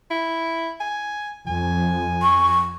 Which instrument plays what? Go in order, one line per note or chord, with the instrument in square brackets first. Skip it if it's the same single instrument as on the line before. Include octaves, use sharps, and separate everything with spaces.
[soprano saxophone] E4
G#5
[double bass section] F2 [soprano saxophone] G#5
[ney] C#6